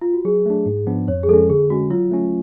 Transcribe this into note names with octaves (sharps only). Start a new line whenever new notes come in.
F4
F#4
F#3 G#4
A3 D4
G#2
F3 B3 D4
F2 C#5
G#4
F3 G#3 C#4 A4
D3 G#4
G#3 C#4 F#4
F#3 F4
A3 C#4